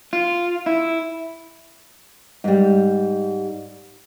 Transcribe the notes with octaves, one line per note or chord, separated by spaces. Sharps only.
F4
E4
G#2 G3